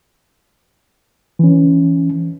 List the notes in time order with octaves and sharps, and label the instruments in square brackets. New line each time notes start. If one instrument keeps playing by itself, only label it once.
[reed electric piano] E3 C#4